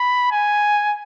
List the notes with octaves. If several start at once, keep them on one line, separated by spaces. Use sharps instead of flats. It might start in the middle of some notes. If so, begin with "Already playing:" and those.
Already playing: B5
G#5